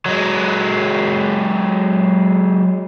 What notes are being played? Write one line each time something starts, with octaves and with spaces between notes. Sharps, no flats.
F#3 G#3